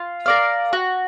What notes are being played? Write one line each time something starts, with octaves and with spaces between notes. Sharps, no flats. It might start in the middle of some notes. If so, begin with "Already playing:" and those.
Already playing: F4
A#4 D5 F5
F#4